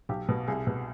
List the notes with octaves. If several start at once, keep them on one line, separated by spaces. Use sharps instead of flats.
B1 G4
B2
C2 G#4
B2